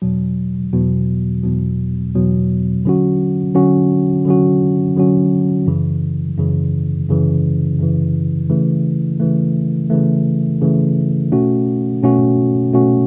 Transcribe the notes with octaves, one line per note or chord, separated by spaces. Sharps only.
E2 B2 F#3
E2 B2 F#3
E2 B2 F#3
E2 B2 F#3
D3 F#3 C#4 F#4
D3 F#3 C#4 F#4
D3 F#3 C#4 F#4
D3 F#3 C#4 F#4
F#2 C#3 E3
F#2 C#3 E3
F#2 C#3 E3
F#2 C#3 E3
C#3 E3 A3
C#3 E3 A3
C#3 E3 A3
C#3 E3 A3
B2 A3 C#4 F#4
B2 A3 C#4 F#4
B2 A3 C#4 F#4